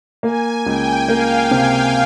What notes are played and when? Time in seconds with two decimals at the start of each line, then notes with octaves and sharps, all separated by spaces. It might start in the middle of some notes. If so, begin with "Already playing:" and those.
0.23 A#3 G#5
0.65 C#2 G5
1.08 A#3 F5
1.37 F5
1.51 C3
1.65 G5